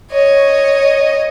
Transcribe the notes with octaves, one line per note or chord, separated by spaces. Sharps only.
C#5 D#5